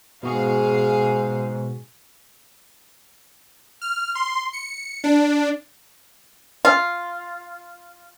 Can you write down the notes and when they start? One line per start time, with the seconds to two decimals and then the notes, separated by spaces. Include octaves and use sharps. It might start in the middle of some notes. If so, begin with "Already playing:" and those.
0.23 G#2 B2 F#4 G#4 F5 C#6
3.81 F6
4.15 C6
4.53 C#7
5.04 D4
6.65 F4